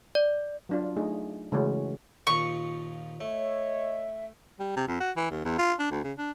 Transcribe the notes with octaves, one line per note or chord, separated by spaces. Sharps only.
D5
F#3 D4 F4
A3 D#4 G#4
C#3 E3 G#3 A3 C#4 F#4
D#2 A#2 F3 C#6
A3 C#5 D#5 E5
G3
C3
F2
F#4
E3
D#2
E2
F4
D4
D2
C#3
D4